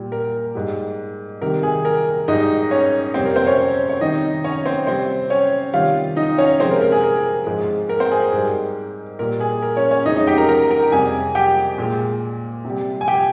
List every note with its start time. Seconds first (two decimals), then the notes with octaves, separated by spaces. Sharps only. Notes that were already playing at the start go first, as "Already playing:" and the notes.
Already playing: A#2 G3
0.12 A#4
0.55 G#2 G3
1.41 C3 D#3 G3 A#4
1.63 G#4
1.85 A#4
2.28 G#2 G3 D#4 D#5
2.71 C#4 C#5
3.14 F2 C3 G3 C4 C5
3.25 A#4
3.36 C4 C5
3.47 C#4 C#5
3.57 C#4 C#5
3.89 C#5
4.01 C3 D#3 G3 D#4 D#5
4.44 C#4 C#5
4.66 C4 C5
4.87 C3 G3 C4 C5
5.30 C#4 C#5
5.74 C3 D#3 G3 F4 F5
6.16 D#4 D#5
6.38 C#4 C#5
6.60 C3 F3 G#3 C4 C5
6.71 A#4
6.82 A#4
6.92 G#4
7.04 A#4
7.46 G#2 F3 G#3
7.89 A#4
8.00 C4 C5
8.11 G#4
8.22 A#4
8.33 G#2 G3
9.19 A#2 G3 A#4
9.40 G#4
9.62 A#4
9.77 C#4 C#5
9.91 C#4 C#5
10.05 F2 C#3 G#3 D#4 D#5
10.16 D#4 D#5
10.27 G4 G5
10.38 A#4 A#5
10.49 A#4 A#5
10.71 A#4 A#5
10.92 F2 C3 G3 G#4 G#5
11.35 G4 G5
11.78 A#2 G#3
12.65 C3 G3
13.01 G#5
13.08 G4 G5